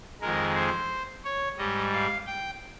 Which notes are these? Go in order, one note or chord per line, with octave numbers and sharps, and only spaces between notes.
F2 D#3 G#3 A#4
C5
C#5
G#2 G3 D#5
F5
G5